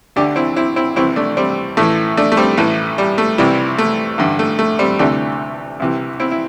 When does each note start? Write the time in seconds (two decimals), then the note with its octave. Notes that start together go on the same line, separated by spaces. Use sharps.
0.16 D2 D3 D4 G4
0.36 C4 E4
0.56 C4 E4
0.76 C4 E4
0.96 C2 C3 E3 C4 E4
1.16 A3 D4
1.37 G3 C4
1.77 A1 A2 E3 A3
2.17 A3 D4
2.32 A3
2.37 G3 C4
2.57 A1 A2 E3 A3
2.98 G3
3.18 A3
3.38 C2 C3 E3 G3
3.78 A3
4.18 A1 G2 D3
4.39 A3
4.59 A3
4.79 G3 C4
4.99 D2 C3 E3 A3 D4
5.80 C2 C3 E3
6.20 C4 E4
6.31 E4